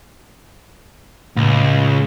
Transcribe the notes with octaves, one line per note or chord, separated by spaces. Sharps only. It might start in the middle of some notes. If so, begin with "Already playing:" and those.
C#2 A2